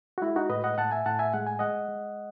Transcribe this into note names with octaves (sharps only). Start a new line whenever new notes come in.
F#4
G#3 E4
D#4 F#4
A2 B4 D#5
D#5 F#5
A2 F#5 A5
E5 G#5
A2 F#5 A5
E5 G#5
G#3 F#5
G#5
G#3 D#5 F#5
G#3